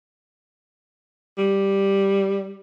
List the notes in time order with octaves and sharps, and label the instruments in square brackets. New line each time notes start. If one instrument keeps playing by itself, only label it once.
[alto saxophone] G3